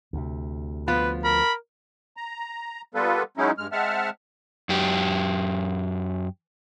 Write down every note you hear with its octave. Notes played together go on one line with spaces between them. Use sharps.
D2 C3
F3 B3 F4 B4
A#4 B5
A#5
G3 A#3 B3 F4 A4 B4
F#3 G#3 C#4 D#4 E4
G2 G#3 F6
G#3 C4 E5 F#5 A5 F6
F#2 G4